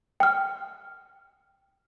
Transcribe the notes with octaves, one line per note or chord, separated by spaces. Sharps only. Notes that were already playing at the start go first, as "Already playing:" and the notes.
G5 F6